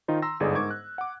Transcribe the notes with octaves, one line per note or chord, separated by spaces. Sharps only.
D#3 D#4 F4 C5
A#5 C6 E6 A#6
G1 G#2 D#4 G#4 A4 D5
G#2 A#4 C#6 D6 G#6
F#6
F#5 D6